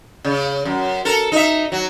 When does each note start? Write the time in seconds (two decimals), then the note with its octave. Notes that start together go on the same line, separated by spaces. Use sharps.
0.25 C#3
0.65 F#2
1.05 A4 A#4
1.32 D#4 E5
1.72 F#3